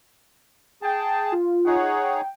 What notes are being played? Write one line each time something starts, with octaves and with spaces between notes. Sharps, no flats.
G#4 G5 A5
F4
D#4 G#4 C#5 D#5 F#5
G5